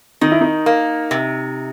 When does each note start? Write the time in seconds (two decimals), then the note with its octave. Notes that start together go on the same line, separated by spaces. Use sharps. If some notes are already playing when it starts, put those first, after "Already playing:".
0.21 D#3 D#4
0.32 E4
0.41 D#4
0.66 A#3
1.11 C3